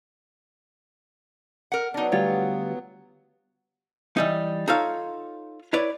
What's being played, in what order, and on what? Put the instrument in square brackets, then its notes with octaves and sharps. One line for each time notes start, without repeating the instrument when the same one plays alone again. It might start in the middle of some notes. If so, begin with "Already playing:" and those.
[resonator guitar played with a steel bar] A#4 F#5
[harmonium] F#3 B3 [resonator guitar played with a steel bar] D4 D#4
[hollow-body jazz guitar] D2 G3 F4 [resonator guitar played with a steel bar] C#5
[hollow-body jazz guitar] E3 G3 D#4
D#4 F4 A4 C#5 F5
E4 B4 C#5 D5